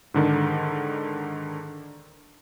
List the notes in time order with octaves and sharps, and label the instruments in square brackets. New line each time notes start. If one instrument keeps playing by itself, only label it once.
[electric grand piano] G#2 D3 D#3